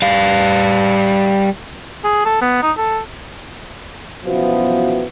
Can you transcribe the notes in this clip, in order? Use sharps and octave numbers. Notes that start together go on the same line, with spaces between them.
G3 F5
G#4
A4
B3
D#4
A4
F#2 B2 E3 F3 B3